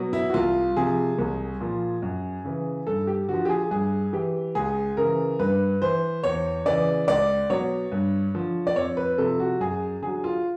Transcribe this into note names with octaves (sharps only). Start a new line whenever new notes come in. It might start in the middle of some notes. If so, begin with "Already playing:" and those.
Already playing: B2 F#3
E4
F#4
C2 F4
C3 F3 G#4
C2
A#2 F3
F#2
C#3 E3
G2 A4
G4
D3 F3 F#4
G4
G#4
G2 G#4
E3 G4
C#2 G#4
C#3 E3 A#4
G2 B4
E3 C5
E2 C#5
C#3 E3 D5
C#2 D5
B2 F#3 C#5
G2
D3 F3
D5
F2 C#5
B4
C3 F3 A4
F#4
F#2 G#4
D3 F#3 G#4
F4